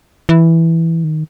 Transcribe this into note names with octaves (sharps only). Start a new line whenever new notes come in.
E3
D#3